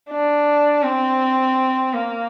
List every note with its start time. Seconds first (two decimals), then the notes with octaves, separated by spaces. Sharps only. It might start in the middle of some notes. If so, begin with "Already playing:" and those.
0.10 D4
0.83 C4
1.94 A#3